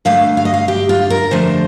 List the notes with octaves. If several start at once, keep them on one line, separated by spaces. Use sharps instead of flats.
G2 D3 A3 F5
F5
D#5
F5
G4
F4
A#4
F2 D3 F3 A3 C5